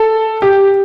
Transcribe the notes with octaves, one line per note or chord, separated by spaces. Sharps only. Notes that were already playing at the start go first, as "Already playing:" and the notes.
Already playing: A4
G4